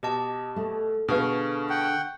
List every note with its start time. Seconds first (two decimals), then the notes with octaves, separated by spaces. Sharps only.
0.03 B2 G4 D#5 A5
0.56 A3
1.08 B2 D3 G#4 B4 F5 C#6 F6
1.70 F#5 G5